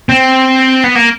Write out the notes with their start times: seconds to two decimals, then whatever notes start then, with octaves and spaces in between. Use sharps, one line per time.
0.09 C4
0.84 B3
0.95 A#3